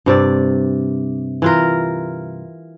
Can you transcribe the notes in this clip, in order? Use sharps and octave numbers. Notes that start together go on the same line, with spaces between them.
G2 C3 D5
E3 F4 A#4